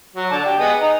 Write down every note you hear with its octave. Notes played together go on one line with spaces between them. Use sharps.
F#3
D3 D5 A5
G4
B3 G#4 D#5
D#4